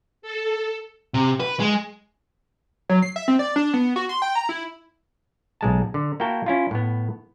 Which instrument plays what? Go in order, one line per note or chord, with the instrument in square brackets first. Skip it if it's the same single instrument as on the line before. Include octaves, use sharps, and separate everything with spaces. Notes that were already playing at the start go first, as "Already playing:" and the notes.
[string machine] A4
[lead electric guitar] C3
B4
G#3
[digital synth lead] F#3
C7
E5
C4
D5
D4
B3
F#4
C6
G5
A#5
E4
[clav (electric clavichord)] B1 G#3 A5
D3
A#3 E4 F#4 G5 A5
C#4 E4 F4
A2 B3